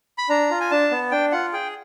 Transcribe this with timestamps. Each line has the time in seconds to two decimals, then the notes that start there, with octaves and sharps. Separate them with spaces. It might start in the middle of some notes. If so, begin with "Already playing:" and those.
0.18 B5
0.29 D4 A#5
0.51 F4
0.60 G#5
0.71 D4 A5
0.91 B3
1.11 D4 G5
1.32 F4 F#5
1.53 G#4 G5